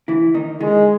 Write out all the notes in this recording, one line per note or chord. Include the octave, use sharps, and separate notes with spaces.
E3 E4
D#3 D#4
D#3 G#3 D#4